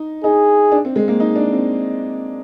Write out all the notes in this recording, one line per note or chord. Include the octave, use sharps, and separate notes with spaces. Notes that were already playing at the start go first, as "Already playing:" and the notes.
Already playing: D#4
D#4 G#4
D4
C4
G#3
A#3
D#4
D4
C4